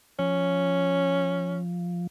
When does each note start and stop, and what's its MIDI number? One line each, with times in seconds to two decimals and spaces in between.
0.19 2.07 53
0.19 1.59 61